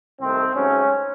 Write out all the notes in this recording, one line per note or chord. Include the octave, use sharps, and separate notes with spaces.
C2 C3 D#3 A3 C4
G#2 F#3 A3 C#4